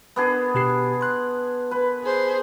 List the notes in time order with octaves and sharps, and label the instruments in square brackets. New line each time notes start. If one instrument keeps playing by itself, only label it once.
[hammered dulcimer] B3 D4 G#4
[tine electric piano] B2 G4 C7
C6 F#6
[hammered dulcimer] B4
[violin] G#4 C5